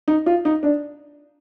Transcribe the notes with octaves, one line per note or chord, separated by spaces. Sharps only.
D#4
F4
D#4
D4